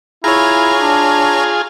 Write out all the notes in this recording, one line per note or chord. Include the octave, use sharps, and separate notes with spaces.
E4 F4 G#4 C#5 A#5
D4